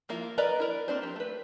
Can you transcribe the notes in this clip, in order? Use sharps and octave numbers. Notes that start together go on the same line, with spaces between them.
F3 A#3 E4 F4
A#4 B4 D5 D#5 A#5
E4 A#4 D5
A#3 C4 D4 C5
F3 G4
A3 B4